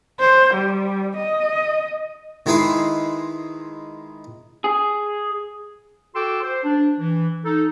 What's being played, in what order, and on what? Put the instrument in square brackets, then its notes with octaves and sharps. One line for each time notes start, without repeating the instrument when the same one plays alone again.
[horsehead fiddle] C5
G3
D#5
[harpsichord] D#3 G#3 E4 G#4 B4 C6
[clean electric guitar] G#4
[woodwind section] F#4 A4 G5 C6 D6 E6
C5
D4
E3
D#4 A4